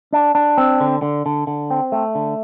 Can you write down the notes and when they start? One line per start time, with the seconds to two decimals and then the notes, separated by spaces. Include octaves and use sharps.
0.13 D4
0.35 D4
0.58 C4
0.80 D3
1.02 D3
1.26 D3
1.47 D3
1.70 C4
1.92 A3
2.15 D3